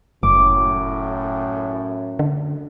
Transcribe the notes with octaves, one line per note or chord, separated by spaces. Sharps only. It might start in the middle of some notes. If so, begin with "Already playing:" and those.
F#1 F#2 A2 D6
D3